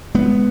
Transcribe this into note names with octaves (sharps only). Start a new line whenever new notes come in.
G#3 B3